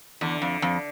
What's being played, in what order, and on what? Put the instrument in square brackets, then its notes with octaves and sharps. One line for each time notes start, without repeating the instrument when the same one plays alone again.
[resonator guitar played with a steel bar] E2 [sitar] D3
[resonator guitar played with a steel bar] F2
F2